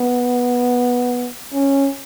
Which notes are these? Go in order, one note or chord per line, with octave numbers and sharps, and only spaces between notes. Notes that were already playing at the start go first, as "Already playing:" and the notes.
Already playing: B3
C#4